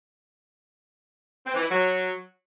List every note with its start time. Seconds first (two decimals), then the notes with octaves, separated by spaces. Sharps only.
1.46 C4
1.54 E3
1.62 E4
1.71 F#3